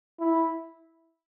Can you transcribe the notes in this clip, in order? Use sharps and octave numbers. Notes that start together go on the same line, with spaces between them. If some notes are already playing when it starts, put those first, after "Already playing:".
E4